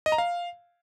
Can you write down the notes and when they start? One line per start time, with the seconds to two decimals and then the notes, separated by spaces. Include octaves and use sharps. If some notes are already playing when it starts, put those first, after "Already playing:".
0.06 D#5
0.12 A#5
0.18 F5